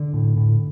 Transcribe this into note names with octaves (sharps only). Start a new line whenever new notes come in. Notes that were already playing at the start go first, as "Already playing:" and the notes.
Already playing: D3
A2
A2